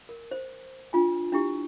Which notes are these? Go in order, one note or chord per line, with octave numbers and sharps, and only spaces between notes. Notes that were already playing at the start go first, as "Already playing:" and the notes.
A#4
C5
D4 F4 G#5
D4 E4 G4